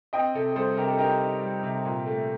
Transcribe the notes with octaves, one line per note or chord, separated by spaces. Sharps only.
C4 D#5 G5
C3 A4
G3 A4 C5
C3 G4 A#4
A4
D#4 G4 A#4
D#4
G3
C3
A#2
A3